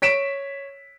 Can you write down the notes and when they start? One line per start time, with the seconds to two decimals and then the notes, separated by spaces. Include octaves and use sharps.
0.02 C#5 B6 D7 E7